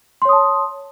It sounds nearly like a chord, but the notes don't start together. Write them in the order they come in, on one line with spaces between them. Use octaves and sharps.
C6 C#5 D#6 A5